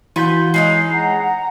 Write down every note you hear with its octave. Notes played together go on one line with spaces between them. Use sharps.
E3 F4 F#4 G#5 B5 G6
G#3 C#4 D#4 C7
F#5 A#5